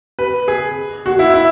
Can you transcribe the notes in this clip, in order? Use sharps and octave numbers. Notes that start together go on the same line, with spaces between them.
B4
G#4
F#4
E4
E4